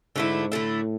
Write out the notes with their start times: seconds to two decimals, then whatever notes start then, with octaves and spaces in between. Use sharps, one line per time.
0.16 G#2 D3 A3 E4
0.52 A2 D3 A3 E4